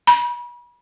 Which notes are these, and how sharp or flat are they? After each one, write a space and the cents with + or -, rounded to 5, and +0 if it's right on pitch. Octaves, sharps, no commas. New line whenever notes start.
B5 -40